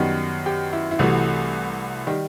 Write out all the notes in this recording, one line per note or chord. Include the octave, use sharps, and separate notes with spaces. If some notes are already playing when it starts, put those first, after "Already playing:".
Already playing: F#2 D#3 G3 B3
G4
E4
E4
C2 C3 E3 A3 F#4
D#3 G3